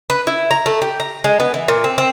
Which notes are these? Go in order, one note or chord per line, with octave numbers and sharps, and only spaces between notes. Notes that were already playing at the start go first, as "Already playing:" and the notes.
B4
E4
A#5
A3
G4
A#5
G#3
B3
E3
A#2
C4
C4